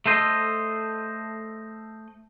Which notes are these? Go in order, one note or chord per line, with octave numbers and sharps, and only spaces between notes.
A3 A4 C5 D#5